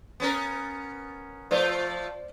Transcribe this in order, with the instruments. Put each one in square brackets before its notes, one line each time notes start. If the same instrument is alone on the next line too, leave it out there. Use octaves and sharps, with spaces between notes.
[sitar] B3 C#4 A#4
[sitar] F3 A3 F4 [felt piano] C5 D5